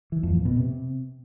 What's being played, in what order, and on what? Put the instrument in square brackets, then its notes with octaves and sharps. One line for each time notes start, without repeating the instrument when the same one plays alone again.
[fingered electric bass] E3
F2
A2
B2
C3